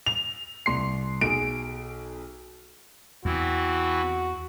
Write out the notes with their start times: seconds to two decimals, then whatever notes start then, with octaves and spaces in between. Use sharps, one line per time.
0.06 F7
0.66 C2 C6 C7
1.21 B1 G#4 D7
3.25 E2 E3 C4 E4 F#4